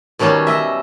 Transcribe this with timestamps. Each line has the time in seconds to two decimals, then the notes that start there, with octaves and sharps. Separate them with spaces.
0.19 B2 D#3 F#3 G3 C#4
0.47 D#5 E5